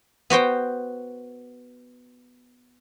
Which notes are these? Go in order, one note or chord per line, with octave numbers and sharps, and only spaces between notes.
B3 F#4 C5 G5